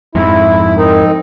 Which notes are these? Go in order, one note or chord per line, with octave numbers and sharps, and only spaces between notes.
F2 G#2 E4
C4 D#4 A#4